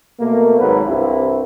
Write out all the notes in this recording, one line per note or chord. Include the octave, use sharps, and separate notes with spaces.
B2 A3 A#3
G#1 F#3 B4
C2 G2 C3 E4